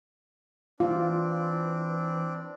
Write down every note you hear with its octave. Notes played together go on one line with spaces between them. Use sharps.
E3 C4 D4 F4